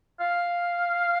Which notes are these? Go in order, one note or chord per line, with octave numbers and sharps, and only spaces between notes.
F5